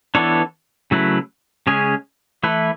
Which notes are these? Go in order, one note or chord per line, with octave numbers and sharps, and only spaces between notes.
E3 B3 D4 A4 C#5
C#3 F#3 A3 E4 B4
C#3 G#3 C#4 G#4 C#5
E3 A3 E4 B4